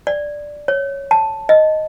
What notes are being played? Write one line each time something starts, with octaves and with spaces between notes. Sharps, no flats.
D5
C#5
A5
D#5